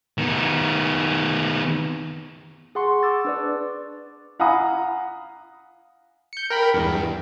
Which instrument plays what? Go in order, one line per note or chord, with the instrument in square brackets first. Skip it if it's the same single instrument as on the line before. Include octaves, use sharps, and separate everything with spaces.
[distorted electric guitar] D#3 B3
[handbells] G#4 F#5 C6 C#6
D6 E6 A6
D4 B4 D5
[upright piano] F5 F#5 G#5 A#5 B5 D#6
[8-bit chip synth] G6 C#7
A#4 G5 B5
E2 G2